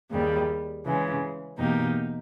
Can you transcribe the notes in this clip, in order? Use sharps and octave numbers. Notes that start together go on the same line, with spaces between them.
D#2 C#3 G3
C#3 E3 G#3
E2 B2 A#3 D#4 G4